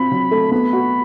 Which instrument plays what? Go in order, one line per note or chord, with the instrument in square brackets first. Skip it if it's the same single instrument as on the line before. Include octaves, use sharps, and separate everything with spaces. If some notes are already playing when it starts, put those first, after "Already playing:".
Already playing: [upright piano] C4 F4 [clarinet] B5
[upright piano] F#3
A3
[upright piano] B3 [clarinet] B5
[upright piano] F#4